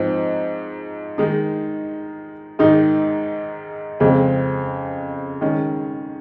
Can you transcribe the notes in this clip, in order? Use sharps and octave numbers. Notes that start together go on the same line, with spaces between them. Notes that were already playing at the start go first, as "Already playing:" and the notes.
Already playing: G#2 F3 C4 D#4
D#3 G#3 D#4
G#2 D#3 G#3 D#4
F2 C#3 G#3 C4
D#3 G#3 C#4